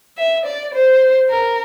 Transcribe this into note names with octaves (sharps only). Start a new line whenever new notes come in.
E5
D5
C5
A#4